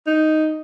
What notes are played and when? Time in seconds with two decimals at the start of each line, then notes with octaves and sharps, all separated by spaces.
0.07 D#4